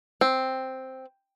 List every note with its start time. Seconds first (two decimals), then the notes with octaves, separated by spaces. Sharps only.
0.21 C4